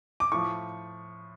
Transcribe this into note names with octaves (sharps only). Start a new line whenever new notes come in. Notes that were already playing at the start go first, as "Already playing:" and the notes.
D6
A2 F3 C#6